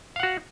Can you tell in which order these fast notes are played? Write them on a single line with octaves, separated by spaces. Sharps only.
F5 F#5 F#4